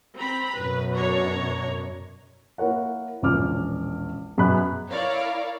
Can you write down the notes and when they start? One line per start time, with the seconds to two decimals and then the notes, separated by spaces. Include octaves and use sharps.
0.18 C4 A#5 B5
0.55 F#2 B2 B4
0.95 D4 C#5 A#5
2.58 A#3 E4 A#4 C#5 F#5
3.22 E1 A#1 C#4 D6 F6
4.38 F#2 B2 G#4 B5 F#6
4.90 E4 A#4 C#5 D5 F5